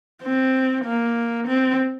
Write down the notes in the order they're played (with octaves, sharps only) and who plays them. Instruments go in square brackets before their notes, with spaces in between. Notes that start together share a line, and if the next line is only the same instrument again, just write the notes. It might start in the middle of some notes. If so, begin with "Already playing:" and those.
[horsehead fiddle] C4
A#3
C4